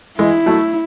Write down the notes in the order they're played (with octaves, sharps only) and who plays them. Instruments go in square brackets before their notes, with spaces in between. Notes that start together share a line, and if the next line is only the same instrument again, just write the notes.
[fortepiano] E3 G#3 [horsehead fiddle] E4
[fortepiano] F#3 A3